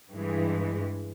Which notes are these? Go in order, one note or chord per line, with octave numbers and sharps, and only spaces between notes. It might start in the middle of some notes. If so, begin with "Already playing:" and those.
G2 E3 G#3